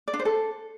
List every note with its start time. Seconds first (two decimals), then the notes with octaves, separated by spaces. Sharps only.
0.08 D5
0.13 D4
0.19 C5
0.25 A4